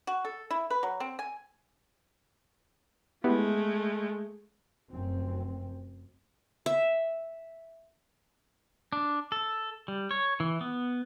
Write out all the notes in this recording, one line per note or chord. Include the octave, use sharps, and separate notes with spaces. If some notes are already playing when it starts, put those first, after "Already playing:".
F#4
A4
E4
B4
F#3
C4
G#5
G#3 A3 B3 E4 G4
F1 F#2 C4
E5
D4
A4
G3
C#5
E3
B3